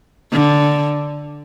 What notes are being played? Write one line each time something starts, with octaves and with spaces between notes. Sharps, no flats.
D3